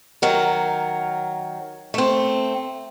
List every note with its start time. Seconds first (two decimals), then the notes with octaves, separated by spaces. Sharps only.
0.22 D#3 F#3 A#4
1.94 A3 C4